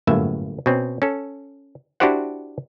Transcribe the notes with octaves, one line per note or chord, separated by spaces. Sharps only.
G1 F#2 A2 A#3 E5
B2 C4 C#4
C#4 A4
D4 E4 F#4 G4 C5 F#5